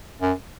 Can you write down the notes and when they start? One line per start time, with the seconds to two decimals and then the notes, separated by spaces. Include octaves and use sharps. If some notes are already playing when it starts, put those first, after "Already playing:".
0.22 F#2